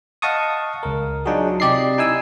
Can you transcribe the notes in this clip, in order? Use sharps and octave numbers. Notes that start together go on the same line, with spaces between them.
D#5 F5 F#5 A5 C#6 D#6
C#2 A#4
F#3 D4 D#4 F4 F#4 G#4
C3 G4 D5 D#5 C7
D#4 E4 G#5 E6